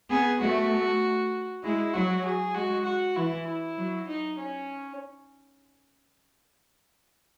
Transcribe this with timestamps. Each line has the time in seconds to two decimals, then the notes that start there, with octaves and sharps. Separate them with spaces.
0.10 B3 G#4
0.41 A3 F#4
1.64 G#3 E4
1.93 F#3 F#4
2.25 G#4
2.55 G#3 F#4
2.85 F#4
3.16 E3 E4
3.47 E4
3.78 F#3
4.08 D#4
4.38 C#4